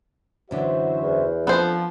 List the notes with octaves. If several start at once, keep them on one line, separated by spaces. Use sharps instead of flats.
F#2 D3 E3 F#4 C5 E5
E2
F3 B3 C4 D4 A4 C5